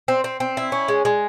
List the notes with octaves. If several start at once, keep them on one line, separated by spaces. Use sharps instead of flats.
C4
C4
C4
E4
C#4
G#3
G#3